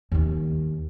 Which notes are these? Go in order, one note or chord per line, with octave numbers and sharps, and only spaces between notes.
D#2 D#3